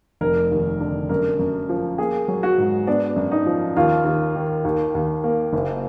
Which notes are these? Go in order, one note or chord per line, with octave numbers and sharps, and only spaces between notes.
F1 A#4
D#2
D3
F#2 A#4
F#2
F3
A#3 G#4
F#3
F#4
G#2
B3 D4
F#2
D#4
F3
D#2 F4
D#2
D#3
D#2
D#2
A#3
F#1